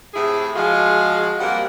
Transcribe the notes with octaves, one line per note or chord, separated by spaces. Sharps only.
A2 C3 E4 G#4
F3 G#3 F4 F#4 G#4
G3 A#3 C4 F#5